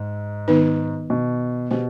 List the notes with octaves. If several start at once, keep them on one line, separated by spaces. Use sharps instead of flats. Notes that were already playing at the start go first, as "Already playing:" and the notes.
Already playing: G#2
D#3 B3 D#4 B4
B2
B2 G4 C5